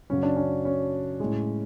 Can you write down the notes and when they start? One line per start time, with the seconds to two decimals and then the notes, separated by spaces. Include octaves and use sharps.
0.10 F#2 C#3 F#3 C#4
0.23 D4
0.36 C#4
0.65 C#4
1.20 A2 G#3